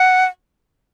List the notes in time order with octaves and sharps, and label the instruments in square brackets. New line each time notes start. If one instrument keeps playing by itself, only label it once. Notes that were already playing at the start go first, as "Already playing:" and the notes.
Already playing: [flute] F#5